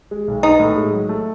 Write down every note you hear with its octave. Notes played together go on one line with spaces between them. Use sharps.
G#3
B1
B3 D#4
A2
G#3
F#3
A3